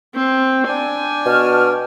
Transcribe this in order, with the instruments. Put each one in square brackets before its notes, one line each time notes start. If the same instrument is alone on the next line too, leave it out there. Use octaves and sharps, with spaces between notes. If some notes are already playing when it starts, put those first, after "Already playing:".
[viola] C4
[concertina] D4 D5 G5 [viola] G#5
[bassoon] B2 [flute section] A5 C#6 F6